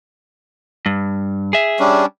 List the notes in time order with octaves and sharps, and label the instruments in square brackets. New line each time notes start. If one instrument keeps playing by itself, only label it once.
[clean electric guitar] G2
G#4 E5
[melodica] G3 C#4 D4